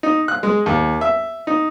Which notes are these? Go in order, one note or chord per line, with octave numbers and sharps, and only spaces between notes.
D#4
F#6
G#3
D#2
E5
D#4